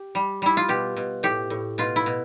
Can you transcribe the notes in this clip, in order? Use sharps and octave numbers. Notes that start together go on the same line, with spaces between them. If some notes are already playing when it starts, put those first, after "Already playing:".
Already playing: G4
G3
G3 E4
F4
B2 G4
B2
A2 G4
A2
B2 F4
E4
B2